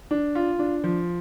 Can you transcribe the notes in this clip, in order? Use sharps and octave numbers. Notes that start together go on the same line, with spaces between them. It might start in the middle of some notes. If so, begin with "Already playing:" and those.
D4
F4
D4
F3